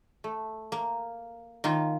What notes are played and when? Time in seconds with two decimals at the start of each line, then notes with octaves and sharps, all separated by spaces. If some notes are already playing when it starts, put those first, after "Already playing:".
0.24 A3
0.72 A#3
1.64 D#3 A#3 F4